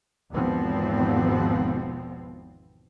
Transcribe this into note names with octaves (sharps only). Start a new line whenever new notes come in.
G#1 E2 B2 F3 B3 C4